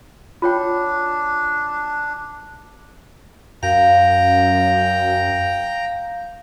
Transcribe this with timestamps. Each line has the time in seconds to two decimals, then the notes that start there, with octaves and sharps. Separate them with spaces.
0.42 D4 F4 C#5 G5
3.63 F#2 F5 G5 A#5